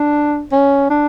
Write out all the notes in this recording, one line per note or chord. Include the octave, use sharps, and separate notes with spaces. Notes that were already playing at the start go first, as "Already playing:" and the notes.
Already playing: D4
C#4
D4